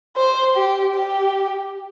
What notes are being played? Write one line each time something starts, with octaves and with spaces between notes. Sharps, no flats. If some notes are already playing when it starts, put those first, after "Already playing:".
C5
G4
G4